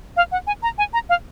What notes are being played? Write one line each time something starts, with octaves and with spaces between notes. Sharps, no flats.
F5
F#5
G#5
A#5
G#5
A#5
F5